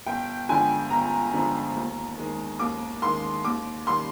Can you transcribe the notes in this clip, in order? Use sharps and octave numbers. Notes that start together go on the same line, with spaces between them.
G1 G5
F2 D3 G#3 G#5
G1 A#5
F2 D3 G#3
D#2
D#3 G#3
D#2 D6
D#3 G#3 C6
D#2 D6
D#3 G3 C6